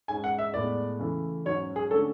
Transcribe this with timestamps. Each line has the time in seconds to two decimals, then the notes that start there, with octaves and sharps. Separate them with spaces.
0.08 G#2 G#3 C#4 G#5
0.24 F#5
0.38 E5
0.54 A2 G#3 B3 D5
0.99 C#3 E3 A3
1.45 G#2 F#3 C#4 C#5
1.76 G#4
1.91 D3 A3 C#4 A4